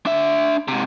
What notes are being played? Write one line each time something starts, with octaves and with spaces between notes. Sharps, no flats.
D4 E5
G#2 C3